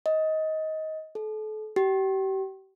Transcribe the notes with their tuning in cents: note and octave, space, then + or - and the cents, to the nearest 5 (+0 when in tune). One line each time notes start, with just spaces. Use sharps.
D#5 +15
A4 -35
G4 -35